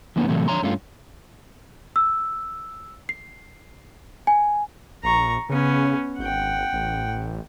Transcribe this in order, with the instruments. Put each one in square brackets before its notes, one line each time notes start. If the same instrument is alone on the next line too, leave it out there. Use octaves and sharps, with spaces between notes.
[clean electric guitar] F2 D3 E3 A#3 B3 C#4
A2 C3 E3 F#3 A3 A#3
D3 F3 C#5 A#5 C6
G2 A3 C#4 F4
[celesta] E6
C7
G#5
[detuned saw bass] A#1 [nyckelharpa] A#5 C#6
[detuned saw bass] C#3 [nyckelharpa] B3 C#4
[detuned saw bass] G#1 [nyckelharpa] F#5 G5
[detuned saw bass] A1